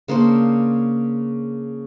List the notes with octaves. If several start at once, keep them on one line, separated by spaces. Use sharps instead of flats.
C#3 A#3 D4 C5